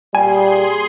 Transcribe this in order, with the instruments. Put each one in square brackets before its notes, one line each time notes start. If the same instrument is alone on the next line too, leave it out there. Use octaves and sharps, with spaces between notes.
[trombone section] A#2 G3 [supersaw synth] G#4 C6 [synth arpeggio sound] G#5